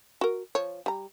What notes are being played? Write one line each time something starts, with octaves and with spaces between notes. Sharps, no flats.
F#4 A#4
F3 C#5
G3 A#5